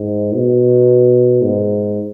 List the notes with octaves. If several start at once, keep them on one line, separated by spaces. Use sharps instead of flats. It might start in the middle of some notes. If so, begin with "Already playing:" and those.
Already playing: G#2
B2
G#2